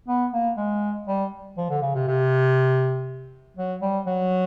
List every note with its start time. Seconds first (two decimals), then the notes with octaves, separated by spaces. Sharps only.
0.08 B3
0.33 A#3
0.57 G#3
1.07 G3
1.57 F3
1.70 D3
1.82 C#3
1.95 C3
2.07 C3
3.57 F#3
3.82 G3
4.07 F#3